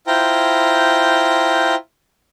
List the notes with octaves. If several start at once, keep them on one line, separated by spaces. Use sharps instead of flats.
E4 F4 C5 G5 A#5